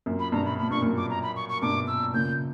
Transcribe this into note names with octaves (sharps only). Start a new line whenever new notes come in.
F#2 A#2
B5
G2 B2 A#5
B5
A#2 B5
G2 C#6
F#2 A#2
D6
A#5
B5
C#6
C#6
G2 B2 D6
E6
A#2 C#3 G6